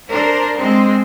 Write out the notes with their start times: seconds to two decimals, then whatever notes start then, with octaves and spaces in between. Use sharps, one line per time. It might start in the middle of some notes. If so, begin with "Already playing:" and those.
0.10 D4 A#4 C5
0.57 G#3 C4